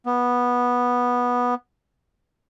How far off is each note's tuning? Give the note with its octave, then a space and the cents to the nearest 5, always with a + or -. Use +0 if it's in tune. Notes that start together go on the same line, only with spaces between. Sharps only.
B3 -10